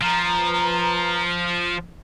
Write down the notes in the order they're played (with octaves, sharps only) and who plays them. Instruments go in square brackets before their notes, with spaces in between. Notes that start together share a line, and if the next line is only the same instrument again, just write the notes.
[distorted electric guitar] F3 [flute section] B4 A#5